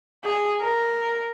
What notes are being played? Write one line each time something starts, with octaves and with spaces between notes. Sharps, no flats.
G#4
A#4